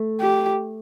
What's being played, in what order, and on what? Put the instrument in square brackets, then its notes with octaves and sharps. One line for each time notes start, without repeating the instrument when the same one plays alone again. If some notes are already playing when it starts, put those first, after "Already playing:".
Already playing: [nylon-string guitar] A3
[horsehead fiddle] G4